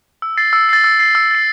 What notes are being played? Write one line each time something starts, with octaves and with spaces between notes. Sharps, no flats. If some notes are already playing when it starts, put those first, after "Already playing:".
E6
A6 C7
E6
A6 C7
E6
A6 C7
E6
A6 C7